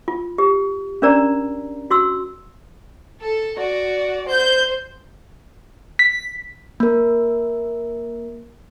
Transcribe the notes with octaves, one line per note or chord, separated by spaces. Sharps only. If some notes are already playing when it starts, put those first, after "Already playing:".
F4
G4
C#4 D4 A#4 D5 A#5
F#4 C6 E6
A4
F#4 D5
C5 G6
B6
A#3 A#4